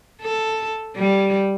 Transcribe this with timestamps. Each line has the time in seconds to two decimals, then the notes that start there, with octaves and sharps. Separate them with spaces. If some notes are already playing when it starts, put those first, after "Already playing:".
0.22 A4
0.96 G3